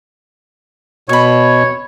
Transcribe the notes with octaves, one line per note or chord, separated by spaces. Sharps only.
B2 C#5 B5 C#6